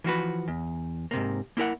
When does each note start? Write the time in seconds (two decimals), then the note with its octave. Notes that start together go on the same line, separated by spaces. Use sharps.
0.04 E3 F3 F#4 B4
0.48 E2
1.11 G#2 C3 A#3
1.57 A#3 E4 A#4 F#5